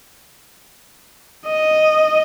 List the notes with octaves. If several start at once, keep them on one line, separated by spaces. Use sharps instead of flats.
D#5